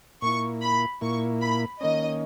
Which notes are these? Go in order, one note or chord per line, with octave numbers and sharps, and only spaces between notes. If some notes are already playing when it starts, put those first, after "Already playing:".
A#2 A#3 E4 C#6
B5
A#2 A#3 E4 C#6
B5
D#3 A#3 C#4 D#5